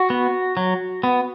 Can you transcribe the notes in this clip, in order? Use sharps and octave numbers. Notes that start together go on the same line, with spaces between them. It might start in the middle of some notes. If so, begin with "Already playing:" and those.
Already playing: F#4
B3
F#3
B3